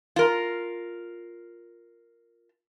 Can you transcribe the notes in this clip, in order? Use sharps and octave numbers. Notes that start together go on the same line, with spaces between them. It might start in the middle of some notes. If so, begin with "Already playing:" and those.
F4 A#4